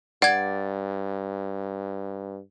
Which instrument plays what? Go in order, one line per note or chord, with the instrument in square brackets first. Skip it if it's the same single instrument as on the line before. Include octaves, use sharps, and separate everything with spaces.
[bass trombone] G2 [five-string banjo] D5 [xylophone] F#5 G#6